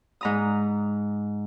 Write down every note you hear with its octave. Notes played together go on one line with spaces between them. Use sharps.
G#2 A#5 D#6